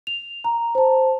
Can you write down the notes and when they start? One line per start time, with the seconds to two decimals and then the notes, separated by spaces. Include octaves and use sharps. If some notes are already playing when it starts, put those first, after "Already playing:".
0.07 F7
0.44 A#5
0.75 C5 A5